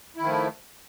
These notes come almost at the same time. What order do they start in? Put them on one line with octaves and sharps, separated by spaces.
E4 D#3 F3 A3